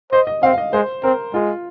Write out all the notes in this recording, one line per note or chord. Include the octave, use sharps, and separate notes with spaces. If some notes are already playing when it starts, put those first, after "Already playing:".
C5 D#5
D#5
C4 F5
F5
D#5
G#3 C5
C4 A#4
G#3 F4